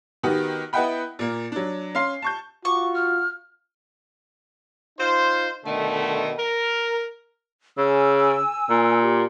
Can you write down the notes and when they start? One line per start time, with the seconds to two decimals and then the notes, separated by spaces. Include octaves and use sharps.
0.23 D#3 B3 F#4 G4
0.73 B3 E4 D#5 F#5 G5 B5
1.19 A#2 A#3
1.52 F#3 D4
1.95 C#4 F5 C6 C7
2.22 A5 C#6 G6
2.65 F4 F#4 C#6 D6
2.95 F6
4.99 D#4 F4 C5
5.65 B2 D3 D#3 A3
6.38 A#4
7.78 C#3 G#5 E6
8.70 A#2
9.02 G4